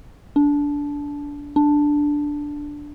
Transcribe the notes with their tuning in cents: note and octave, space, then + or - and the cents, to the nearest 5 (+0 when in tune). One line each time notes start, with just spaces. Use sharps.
D4 -20
D4 +0